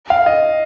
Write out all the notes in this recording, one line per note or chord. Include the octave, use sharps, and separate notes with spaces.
F5
D#5